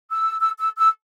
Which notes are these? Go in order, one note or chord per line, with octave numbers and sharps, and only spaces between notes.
E6
E6
E6
E6